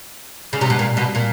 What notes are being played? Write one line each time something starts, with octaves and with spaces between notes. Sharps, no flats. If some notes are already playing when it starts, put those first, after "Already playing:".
C#3
C3
B2
A#2
B2
A#2